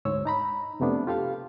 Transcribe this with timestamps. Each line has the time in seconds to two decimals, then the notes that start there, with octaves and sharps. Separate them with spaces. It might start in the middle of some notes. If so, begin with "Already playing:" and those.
0.05 D2 G#2 G#3 C#5 E6
0.25 D#4 A#5 B5
0.80 F2 C3 A3 B3 D4
1.07 F4 G4 A4 F5